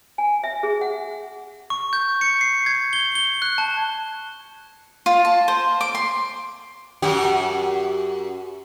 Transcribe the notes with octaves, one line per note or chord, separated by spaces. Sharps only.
G#5
E5
G#4
F#5
C#6
G6
C#7
C7
G#6
G7
G7
F#6
A5
F4
A5
C5
D6
C6
F#2 F#4 G4